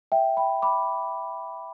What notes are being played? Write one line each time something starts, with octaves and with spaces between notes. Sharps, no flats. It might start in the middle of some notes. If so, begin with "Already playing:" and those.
E5 G5
G5 B5
B5 D6